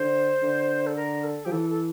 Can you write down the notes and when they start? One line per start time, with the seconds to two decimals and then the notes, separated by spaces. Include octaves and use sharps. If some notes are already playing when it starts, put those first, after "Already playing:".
Already playing: D3 C5
0.43 D3
0.87 A4
0.96 A#4
1.24 A4
1.45 F3 G4
1.52 E3 A4
1.70 A4